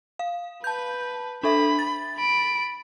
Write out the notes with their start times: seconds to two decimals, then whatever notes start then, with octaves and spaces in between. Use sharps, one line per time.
0.19 F5
0.64 B4 A5 G6
1.43 D4 A4 E5 B5
1.79 A6
2.18 B5 D7